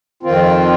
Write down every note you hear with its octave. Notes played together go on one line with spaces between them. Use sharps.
F2 D#3 C4 F4